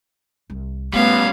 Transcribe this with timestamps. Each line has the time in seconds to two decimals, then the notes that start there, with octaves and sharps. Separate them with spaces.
0.50 C2
0.93 G3 A3 B3 C#4 D#4 F5